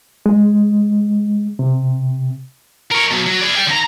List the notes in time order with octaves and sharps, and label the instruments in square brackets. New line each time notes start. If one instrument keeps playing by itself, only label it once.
[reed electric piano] G#3
C3
[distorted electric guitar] A#4 C#5
B2 F#3
F#3
G#4 D5
D5 G5
D#2 A#5